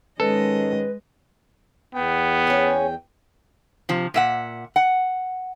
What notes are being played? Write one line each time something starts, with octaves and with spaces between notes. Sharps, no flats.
G#2 D#3 G#3 C#4 A4 B4 D#5
E2 B3 G5
C#4 G#4
C3 F3
A#2 E5 F#5
F#5